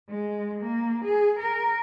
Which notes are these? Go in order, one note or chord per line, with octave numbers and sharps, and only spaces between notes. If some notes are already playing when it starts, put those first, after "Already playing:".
G#3
A#3
G#4
A#4